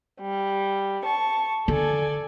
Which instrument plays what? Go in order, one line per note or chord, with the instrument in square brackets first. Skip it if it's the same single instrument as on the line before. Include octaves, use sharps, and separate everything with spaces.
[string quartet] G3
A5 C#6
[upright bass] D3 [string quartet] A4 D5 G#5